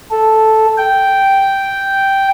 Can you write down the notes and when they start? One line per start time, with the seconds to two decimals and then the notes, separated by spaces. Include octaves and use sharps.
0.11 A4
0.78 G5